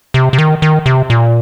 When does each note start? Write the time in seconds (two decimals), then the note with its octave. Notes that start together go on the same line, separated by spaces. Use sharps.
0.14 C3
0.33 C3
0.38 D#3
0.62 D#3
0.86 C3
1.10 A#2